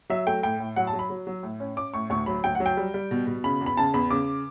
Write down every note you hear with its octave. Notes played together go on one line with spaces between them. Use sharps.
F#3 E5
A3 G5
A2 G5
A2
F#3 F#5
A5
F#3
B5
F#3
F#3
A2
C#4
C#4 D6
A2 C#6
D2 C#6
F#3 B5
D2 G5
F#5
F#3
G5
G3
G3
B2
B2
C#3 B5
E2
B5
C#3 A5
E2 B5
C#3 D6